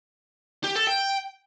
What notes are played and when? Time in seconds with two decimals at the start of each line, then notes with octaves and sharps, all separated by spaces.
0.64 G4
0.75 A4
0.87 G5